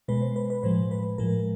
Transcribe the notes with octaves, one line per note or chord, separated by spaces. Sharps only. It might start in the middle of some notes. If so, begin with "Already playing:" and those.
B2 G#3 B4
C5
B4
B4
A2 F3 G#3 C5
B4
A2 F3 G#3 A#4